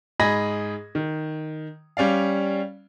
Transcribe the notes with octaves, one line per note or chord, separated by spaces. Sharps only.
G#2 G#4 D#5 B5 G#6 A#6
D#3
G3 C#4 D5 F5